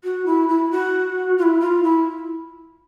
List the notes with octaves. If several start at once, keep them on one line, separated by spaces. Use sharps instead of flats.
F#4
E4
E4
F#4
F4
E4
F4
E4